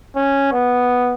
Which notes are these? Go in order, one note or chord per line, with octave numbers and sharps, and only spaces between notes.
C#4
B3